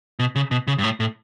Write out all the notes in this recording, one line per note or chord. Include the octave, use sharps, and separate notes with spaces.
B2
C#3
B2
C#3
G2
A2
A2